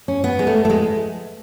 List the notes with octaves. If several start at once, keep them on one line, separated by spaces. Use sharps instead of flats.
C#4
B3
G#3
A3
A3
G#3